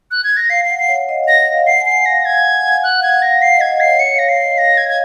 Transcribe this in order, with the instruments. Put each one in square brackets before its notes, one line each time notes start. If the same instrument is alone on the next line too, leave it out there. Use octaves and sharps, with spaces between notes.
[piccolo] F#6
G#6
A#6
[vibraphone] F5 [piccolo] C7
[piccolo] C7
[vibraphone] F#5
[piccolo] C7
[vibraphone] C#5
D#5
D#5
[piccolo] A#6
[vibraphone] D#5
F5
[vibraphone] F#5 [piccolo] C7
[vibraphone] G#5
[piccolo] C7
[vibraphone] F5 [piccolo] A#6
[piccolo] G#6
[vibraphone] F#5
G#5
F#5
[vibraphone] F#5 [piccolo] F#6
[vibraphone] F5
[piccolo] G#6
[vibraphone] F#5
[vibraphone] F5 [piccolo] A#6
[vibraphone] F5 [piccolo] C7
[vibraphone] D#5
[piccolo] G#6
[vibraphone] D#5
[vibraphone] C#5 [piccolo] C7
[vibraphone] C#5 [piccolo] C#7
[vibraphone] F5
[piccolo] A#6
[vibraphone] F5 [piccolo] C7
[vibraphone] D#5
[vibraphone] C#5 [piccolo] A#6
[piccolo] G#6
G#6